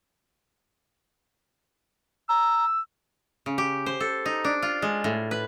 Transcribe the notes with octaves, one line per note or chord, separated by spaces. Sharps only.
A#5 E6
C#3
G4
C5
A4
D#4
D4
F4
G#3
A2
B4